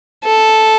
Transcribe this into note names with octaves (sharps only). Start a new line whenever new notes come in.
A4